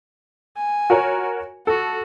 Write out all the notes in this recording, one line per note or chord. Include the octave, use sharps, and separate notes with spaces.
G#5
F#4 A#4 C#5
F#4 A4